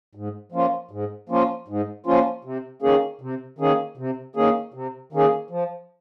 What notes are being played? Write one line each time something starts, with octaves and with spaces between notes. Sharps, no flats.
G#2
F3 A#3 C#4 F4
G#2
F3 A#3 C#4 F4
G#2
F3 A#3 C#4 F4
C3
D#3 A#3 C#4 G#4
C3
D#3 A#3 C#4 G#4
C3
D#3 A#3 C#4 G#4
C3
D#3 A#3 C#4 G#4
F3